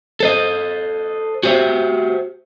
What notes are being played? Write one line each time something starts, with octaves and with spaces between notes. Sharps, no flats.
A4 C5 D#5
F#4 G4 C5 D#5 E5